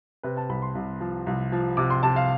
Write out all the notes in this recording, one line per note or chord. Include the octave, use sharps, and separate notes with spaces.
C3 B4
A5
C2 B5
C6
C2
F3
C2
F3
C3 D6
C6
C3 A5
F5